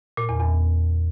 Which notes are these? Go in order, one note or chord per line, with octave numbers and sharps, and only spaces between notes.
A#2
E2
E2